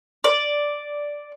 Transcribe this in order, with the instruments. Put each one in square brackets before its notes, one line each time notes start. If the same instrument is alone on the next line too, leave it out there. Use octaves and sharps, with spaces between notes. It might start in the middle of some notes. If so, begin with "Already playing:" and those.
[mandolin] D5